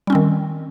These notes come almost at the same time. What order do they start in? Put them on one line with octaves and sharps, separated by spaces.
G3 C#4 C4 D#3